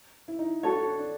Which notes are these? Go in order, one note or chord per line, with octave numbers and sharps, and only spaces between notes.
E4
D#4
D4 F#4 A4 C#5
D4
D4
D4